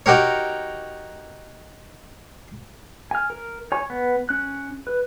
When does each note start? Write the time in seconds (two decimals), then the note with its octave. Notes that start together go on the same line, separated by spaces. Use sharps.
0.06 D#4 F#4 G4 A#4 C#5
3.11 G#5 F6
3.30 A#4
3.72 C#5 G#5 C#6
3.90 B3
4.29 C#4 F#6
4.87 B4